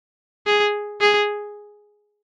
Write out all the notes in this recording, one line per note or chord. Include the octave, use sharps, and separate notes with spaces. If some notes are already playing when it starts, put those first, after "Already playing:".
G#4
G#4